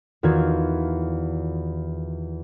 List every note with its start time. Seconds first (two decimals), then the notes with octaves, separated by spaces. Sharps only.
0.23 E2 D#3 F4 F#4 G#6